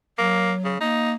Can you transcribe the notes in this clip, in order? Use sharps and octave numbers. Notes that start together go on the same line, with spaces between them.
F#3 A#3
C#3
A#3 D#4